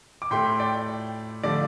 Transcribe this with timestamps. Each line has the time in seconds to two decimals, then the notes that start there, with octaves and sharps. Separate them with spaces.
0.22 D6
0.31 A2 A3 G5 C6
0.60 D5 G5
1.43 D3 F3 A3 D5